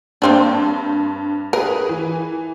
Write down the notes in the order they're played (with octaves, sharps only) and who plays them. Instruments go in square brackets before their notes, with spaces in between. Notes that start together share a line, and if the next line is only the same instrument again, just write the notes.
[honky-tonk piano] G2 [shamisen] A#3 C4 D4
[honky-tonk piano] G#4 B4 [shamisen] A#4
[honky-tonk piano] E3